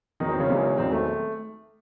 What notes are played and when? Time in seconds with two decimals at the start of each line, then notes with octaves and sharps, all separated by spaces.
0.20 E1 E2 D#3 F#3 D#4
0.30 C4
0.39 C#3 C#4
0.49 E1 E2 D#3 F#3
0.78 E1 E2 D#3 F#3 C4
0.92 A3